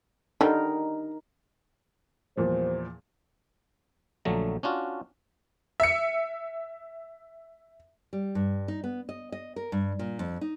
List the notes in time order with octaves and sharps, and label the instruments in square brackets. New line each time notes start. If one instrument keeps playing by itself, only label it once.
[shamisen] D3 D#3 G3 [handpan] D#4 A#4
[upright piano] E2 A#2 F3 [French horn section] G3 C5
[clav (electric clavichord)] A#1 D3 F#3 A3 A#5
C#4 D4 F4 F#4
[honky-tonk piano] E5 C#7
[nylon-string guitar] G3
G2
D#4
B3
D#5
D#5
A#4
G2
A#2
F2
D#4